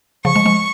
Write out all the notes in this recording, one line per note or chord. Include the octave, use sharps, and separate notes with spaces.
C#3 F3 C#6
F3 G#3
F3 G#3